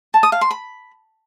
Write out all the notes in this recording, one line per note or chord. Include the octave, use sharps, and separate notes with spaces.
A5
D#6
F5
C6
B5